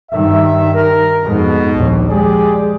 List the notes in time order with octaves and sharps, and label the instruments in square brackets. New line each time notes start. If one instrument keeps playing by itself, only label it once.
[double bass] G2 D#3 [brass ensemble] E5
[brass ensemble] A#4
[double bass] F2 G#2 [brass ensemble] B2
[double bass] A#1 D#2
[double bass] F3 G#3 [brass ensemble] G4 G#4 D5